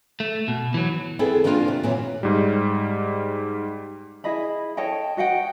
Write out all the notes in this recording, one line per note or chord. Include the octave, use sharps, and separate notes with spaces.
A3
B2
E3 F#3
B3 C4 E4 G#4 A4
D#3 F3 A#3 D4 F4
C3
A#2 E3 F#3
G#2 G3
E4 G#4 D#5 B5
A4 C#5 D#5 G5
F#4 D#5 F#5 G5